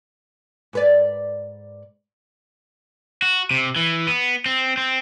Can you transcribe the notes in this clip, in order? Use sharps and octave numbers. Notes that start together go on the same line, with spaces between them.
G#2 B4 D5
F#4
C3
E3
B3
C4
C4